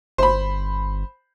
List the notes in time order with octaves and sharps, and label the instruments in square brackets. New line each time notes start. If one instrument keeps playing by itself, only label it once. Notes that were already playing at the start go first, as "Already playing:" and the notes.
[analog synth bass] G1 [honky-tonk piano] C5 B5